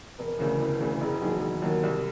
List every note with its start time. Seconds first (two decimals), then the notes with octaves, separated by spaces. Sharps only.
0.18 E1 A#4 B4
0.39 D2 C#3 E3
0.60 E1
0.80 D2 C#3 E3
1.01 E1 A#4
1.04 G#4
1.22 D#2 D#3 F#3
1.42 E1
1.62 D#2 D#3 F#3 A#4
1.83 C2